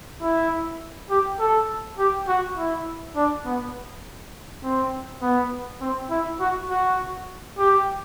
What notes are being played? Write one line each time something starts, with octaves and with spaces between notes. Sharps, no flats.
E4
G4
A4
G4
F#4
E4
D4
B3
C4
B3
C4
E4
F#4
F#4
G4